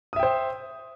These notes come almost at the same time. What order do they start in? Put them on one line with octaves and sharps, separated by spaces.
D#6 E5 G5 C5